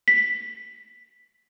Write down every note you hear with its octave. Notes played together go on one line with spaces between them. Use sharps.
B6